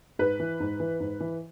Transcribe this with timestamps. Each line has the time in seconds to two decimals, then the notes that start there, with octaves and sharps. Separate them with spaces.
0.19 G#2 B4
0.40 E3
0.60 G#2
0.80 E3
1.00 G#2
1.20 E3